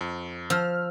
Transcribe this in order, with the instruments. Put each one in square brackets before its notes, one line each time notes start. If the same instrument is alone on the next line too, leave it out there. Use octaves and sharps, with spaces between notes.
[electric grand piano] F2
[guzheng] F3 [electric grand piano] E6 F6